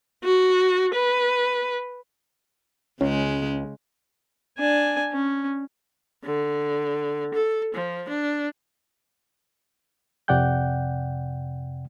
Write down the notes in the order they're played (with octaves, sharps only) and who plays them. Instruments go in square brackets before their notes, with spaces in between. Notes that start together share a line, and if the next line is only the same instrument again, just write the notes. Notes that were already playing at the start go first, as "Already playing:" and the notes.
[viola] F#4
B4
[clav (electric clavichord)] C#2 [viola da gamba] C#3 G#3 [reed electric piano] C#4
[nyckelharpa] D4 G#5
C#4
[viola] D3
A4
F3
D4
[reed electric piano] F2 C3 D5 F#5 G5 G6